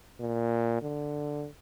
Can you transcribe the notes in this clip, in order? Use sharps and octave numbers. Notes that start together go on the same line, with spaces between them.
A#2
D3